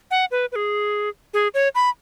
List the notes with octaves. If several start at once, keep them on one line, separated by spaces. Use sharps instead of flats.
F#5
B4
B4
G#4
G#4
C#5
B5